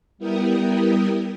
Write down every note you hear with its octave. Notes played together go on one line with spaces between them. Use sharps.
G3 B3 E4 A#4 G5 D#6